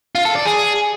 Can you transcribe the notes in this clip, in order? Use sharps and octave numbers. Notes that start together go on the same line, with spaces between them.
F4
A4
D5
G#4